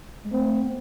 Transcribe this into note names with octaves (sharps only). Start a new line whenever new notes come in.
G#3
A3 C4
B3